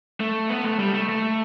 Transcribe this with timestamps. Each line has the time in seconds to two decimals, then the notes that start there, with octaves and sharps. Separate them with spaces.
0.20 A3
0.49 B3
0.64 A3
0.79 G3
0.94 A3
1.09 A3